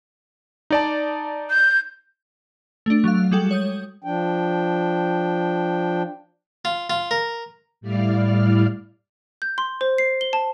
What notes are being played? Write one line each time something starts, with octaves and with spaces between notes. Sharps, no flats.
D#4 D5 A5
G6
A3 D4
F#3 F5
G3 G#3 F#4 A4 G5
C#5 D#6 G6
F3 D4 G5
F4
F4
A#4
A2 G3 E4 D5 F5 F6
G6
C6
C5
C7
G7
A5